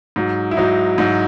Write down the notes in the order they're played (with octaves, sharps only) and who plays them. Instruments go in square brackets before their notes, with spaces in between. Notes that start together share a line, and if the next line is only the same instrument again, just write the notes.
[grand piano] G#2 F#3
E4
G#2 F#3 D#4
G#2 F#3